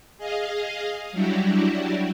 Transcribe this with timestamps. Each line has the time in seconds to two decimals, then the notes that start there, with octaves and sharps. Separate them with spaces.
0.18 G#4 D#5 F5
1.12 F#3 G3 D4 E4 F#4 G4